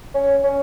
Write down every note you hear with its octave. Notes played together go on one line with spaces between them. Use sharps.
C#4
C#4